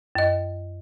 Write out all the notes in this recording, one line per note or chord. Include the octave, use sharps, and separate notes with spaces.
F#2 D#5